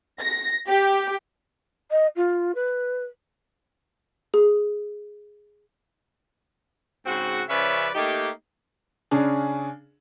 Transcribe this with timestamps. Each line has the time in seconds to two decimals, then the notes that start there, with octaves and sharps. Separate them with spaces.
0.20 A#6
0.69 G4
1.91 D#5
2.16 F4
2.55 B4
4.34 G#4
7.06 G#2 C#3 C4 F#4
7.49 C#3 F3 C#4 B4 D5 E5
7.95 A3 A#3 D#4 G4
9.11 C#3 C#4 D4 G#4